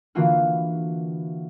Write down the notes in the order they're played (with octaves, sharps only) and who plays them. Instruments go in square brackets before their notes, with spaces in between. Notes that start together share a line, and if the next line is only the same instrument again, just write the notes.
[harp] D3 E3 A#3 F4 F#4 B4